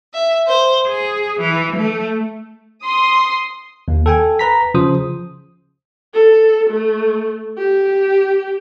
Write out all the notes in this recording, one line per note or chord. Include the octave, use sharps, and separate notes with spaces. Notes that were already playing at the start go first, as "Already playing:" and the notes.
E5
C5
G#4
E3
A3
C6 D#6
D#2
A4 G5 G#5
B4 A#5 B6
C#3 F3 C5 D#6
A4
A3
G4